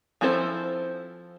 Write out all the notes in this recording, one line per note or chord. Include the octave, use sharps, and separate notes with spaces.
F3 C4 E4 A4 C5